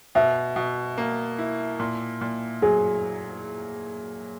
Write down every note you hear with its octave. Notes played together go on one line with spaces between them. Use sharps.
B2 E5
B2
A#3
E4
A#2
A#2
F#3 G#4